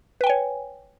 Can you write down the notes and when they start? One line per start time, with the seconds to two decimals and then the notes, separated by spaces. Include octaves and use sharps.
0.21 B4
0.24 G5
0.27 G#5
0.30 C#5